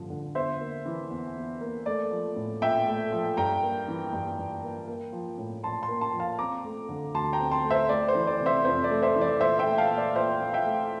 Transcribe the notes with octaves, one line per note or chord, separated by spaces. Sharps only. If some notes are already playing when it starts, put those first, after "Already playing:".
Already playing: A1 G2 D3 F3
D3
E2 C5 E5
A#3
E3
E2
E2
A#3
A3 D5
F3
A2
A#1 E5 G5
A3
F3
G2 G5 A#5
A#3
E3
G2
G2
A#3
A#3
F3
A2
A#1 A5 C6
A5 C6
A#3
A5 C6
F3
F5 A5
C4 A#5 D6
A3
D3
D2 A5 C6
G5 A#5
C4
A5 C6
A3
C5 E5
A3 D5
C5
E3
D5
C3
C5 E5
F2 C5
D5
A3
C5 E5
E3
D5
A#1 C5 E5
E5 G5
A3
F5 A5
A#2
D5
A#1 C5 E5
A#1
E5 G5
A3